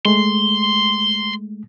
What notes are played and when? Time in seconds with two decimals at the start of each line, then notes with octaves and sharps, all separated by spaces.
0.05 G#3 A3 C6